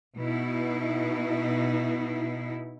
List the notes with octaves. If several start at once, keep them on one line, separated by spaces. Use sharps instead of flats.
B2 D#4 E4